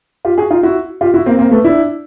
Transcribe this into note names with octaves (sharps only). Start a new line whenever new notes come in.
F4 G4
F#4 G#4
D#4 F4
E4 F#4
F4 G4
E4 F#4
A#3 C4
A#3 C4
A3 B3
D4 E4